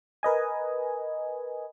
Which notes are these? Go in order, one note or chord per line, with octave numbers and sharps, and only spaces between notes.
A#4 B4 D#5 G#5